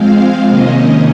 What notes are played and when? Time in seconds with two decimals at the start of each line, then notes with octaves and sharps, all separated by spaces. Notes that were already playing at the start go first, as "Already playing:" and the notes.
Already playing: F3 G#3 C4 F5
0.48 C3 D#3 A#3 C#4 D#5